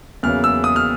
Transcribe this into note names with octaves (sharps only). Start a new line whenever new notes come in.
E2 C#3 F#3 A#3 F6
E6
D#6
F6